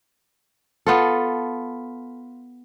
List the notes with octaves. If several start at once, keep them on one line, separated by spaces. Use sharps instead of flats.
B3 F4 A4